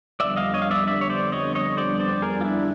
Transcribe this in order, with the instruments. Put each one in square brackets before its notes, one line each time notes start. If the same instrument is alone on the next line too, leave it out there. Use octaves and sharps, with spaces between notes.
[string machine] F2 D3 G3 B3 D4 [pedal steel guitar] D5 E5
[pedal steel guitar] D#5 F5
C#5 D#5
F5
D5 E5
D5 E5
C#5
C5 D5
C#5 D#5
C#5 D#5
C5 D5
C5 D5
G#4 A#4
F4
D4 E4